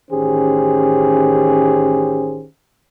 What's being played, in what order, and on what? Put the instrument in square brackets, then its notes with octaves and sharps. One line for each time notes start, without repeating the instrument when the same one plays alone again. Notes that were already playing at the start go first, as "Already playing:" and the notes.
[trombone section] A1 D#3 C#4 G4 G#4 C5